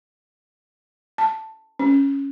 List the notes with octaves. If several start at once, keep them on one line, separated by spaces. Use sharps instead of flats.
A5
C#4